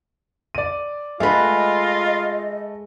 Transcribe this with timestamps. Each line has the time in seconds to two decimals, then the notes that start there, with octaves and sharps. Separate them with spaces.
0.55 D5 D#7
1.20 G#3 A3 F4 B4 D#5